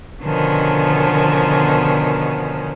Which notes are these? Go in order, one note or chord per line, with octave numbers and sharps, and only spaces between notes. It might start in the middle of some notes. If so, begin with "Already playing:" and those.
B2 D3 D#3 F3 B3 C#4